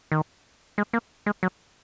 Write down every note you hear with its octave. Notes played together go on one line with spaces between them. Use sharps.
D#3
G#3
A#3
G#3
F#3